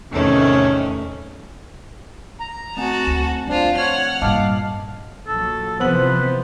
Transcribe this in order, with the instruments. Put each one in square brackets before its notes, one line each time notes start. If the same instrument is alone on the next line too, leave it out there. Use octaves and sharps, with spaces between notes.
[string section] E2 A2 C3 D#3 A3 C#4
[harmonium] A#5
[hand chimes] A3 C4 G#5 [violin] F#4 A5
[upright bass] D2
[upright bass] F3 [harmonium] D4 [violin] F4 C5
[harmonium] C#5 [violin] F#5 F6
[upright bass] G2 A#2 [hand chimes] D#5 A5 D6 [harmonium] F5
[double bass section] A#1 F#3 [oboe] A4
[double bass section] C3 E3 F3 [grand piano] B3 F#7 [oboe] B4 [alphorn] C5